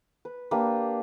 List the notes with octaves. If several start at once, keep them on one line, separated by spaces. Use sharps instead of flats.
B4
A#3 D4 G4 B4